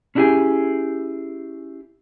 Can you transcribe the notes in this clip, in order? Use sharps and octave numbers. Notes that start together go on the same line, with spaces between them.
C#4 D4 E4 G4 G#4 G#5